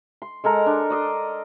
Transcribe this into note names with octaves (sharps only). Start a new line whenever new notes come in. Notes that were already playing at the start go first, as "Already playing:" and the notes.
C6
G#3 A4 A#4 A#5
D4
D5 D#5 C6